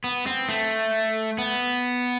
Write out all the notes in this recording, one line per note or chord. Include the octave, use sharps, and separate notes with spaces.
B3
C4
A3
B3